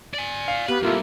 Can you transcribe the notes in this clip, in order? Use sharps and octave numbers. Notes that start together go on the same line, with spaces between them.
D5 G#5
F5
B3 G4 B4
C2 B2 A#3 E4 F4 A4